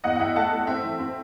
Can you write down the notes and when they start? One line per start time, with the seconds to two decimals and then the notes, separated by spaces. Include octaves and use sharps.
0.04 E2 D#5 F#5
0.16 F#5
0.19 E2 E5 G5
0.36 A3 F#5 A5
0.52 A3
0.67 C4 E5 G5
0.83 E3
1.00 C4